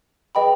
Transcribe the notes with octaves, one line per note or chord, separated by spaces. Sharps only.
G#4 B4 D#5 G5 B5